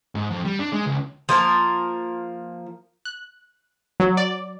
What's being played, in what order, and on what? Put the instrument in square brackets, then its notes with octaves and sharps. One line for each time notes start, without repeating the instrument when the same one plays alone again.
[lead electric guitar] G#2
F2
G3
D4
G#3
C#2
[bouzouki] F3 A#3 A#4 A5
[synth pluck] F#6
F#3
D5